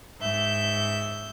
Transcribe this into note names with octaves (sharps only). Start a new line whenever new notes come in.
G#2 E5 G6